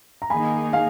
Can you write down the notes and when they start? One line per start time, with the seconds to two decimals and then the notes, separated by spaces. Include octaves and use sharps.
0.22 A#5
0.30 D#3 A#3 D#4 G#4 G#5 B5
0.73 F5 G#5